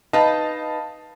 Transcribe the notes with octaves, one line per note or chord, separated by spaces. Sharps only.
D#4 B4 D#5 F5 A5